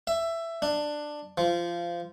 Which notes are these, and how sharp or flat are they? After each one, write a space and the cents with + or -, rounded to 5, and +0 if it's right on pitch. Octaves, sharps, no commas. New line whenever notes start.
E5 +15
D4 +10
F3 -20